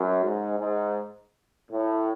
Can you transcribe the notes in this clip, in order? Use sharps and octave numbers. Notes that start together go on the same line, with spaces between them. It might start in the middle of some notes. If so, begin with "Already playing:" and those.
Already playing: F#2
G#2
G#2
A2